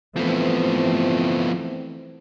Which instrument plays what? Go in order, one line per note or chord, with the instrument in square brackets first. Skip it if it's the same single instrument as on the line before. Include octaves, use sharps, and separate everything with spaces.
[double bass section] E3 A3 C4 [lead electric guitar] F3 B3